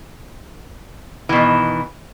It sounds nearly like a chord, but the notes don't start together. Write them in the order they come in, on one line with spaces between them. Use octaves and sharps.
E3 B2 D#3